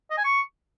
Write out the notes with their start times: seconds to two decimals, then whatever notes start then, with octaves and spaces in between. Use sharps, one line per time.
0.10 D#5
0.17 G#5
0.24 C#6